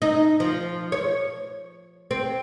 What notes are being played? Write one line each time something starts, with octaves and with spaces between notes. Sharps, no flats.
D#4
F3
C#5
C4